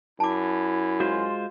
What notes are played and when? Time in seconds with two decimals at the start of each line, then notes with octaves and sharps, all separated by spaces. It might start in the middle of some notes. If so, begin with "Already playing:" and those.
0.20 F#2 E4 A5 D6
1.00 G#3 F4 F#4 C5